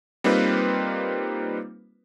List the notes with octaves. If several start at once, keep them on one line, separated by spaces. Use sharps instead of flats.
G3 A#3 C4 D#4 F4 B4